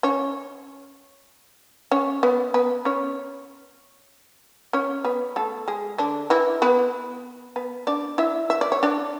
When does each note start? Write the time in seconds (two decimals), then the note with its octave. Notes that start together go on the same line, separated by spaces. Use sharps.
0.03 C#4 C#5
1.91 C#4 C#5
2.23 B3 B4
2.54 B3 B4
2.85 C#4 C#5
4.73 C#4 C#5
5.05 B3 B4
5.36 A3 A4
5.68 G#3 G#4
5.98 D3 D4
6.30 E3 E4
6.62 B3 B4
7.56 B3 B4
7.87 D4 D5
8.18 E4 E5
8.50 E5
8.61 D5
8.72 C#5
8.83 D4 D5